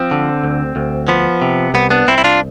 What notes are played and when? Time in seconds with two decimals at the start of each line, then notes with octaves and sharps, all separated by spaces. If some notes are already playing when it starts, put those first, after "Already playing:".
Already playing: F3 C4
0.11 D3
0.44 D2
0.76 D2
1.08 F3 B3
1.42 C3
1.74 C2 B3
1.90 B3 D4
2.07 C2 C4 E4
2.18 E4
2.24 D4 F4